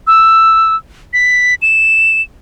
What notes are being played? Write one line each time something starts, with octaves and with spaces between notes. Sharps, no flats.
E6
B6
E7